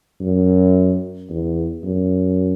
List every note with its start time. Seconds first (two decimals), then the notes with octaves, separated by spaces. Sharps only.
0.21 F#2
1.30 E2
1.84 F#2